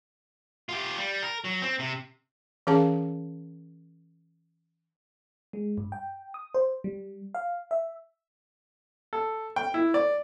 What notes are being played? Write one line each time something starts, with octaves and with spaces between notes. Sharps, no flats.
F4 G4
G3
A#4
F#3
C4
C3
E3 C#4 G#4 A#4 F5 A5
G#3
G2
G5
D#6
C5
G3
F5
E5
A4
G5
E4
D5